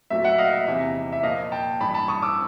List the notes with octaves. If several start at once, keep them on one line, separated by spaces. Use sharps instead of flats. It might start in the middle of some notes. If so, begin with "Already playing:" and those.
A#2 F#3 A3 E5
E5 F#5
D#5 F5
E5
F1 E2 C3 E5
E5
A#2 F3 A#3 D#5 F5
G5 A5
A1 G2 E3 A5 B5
A5 B5
C#6 D#6
D6 E6